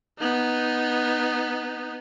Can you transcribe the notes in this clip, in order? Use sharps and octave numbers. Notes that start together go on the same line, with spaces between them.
B3 D#4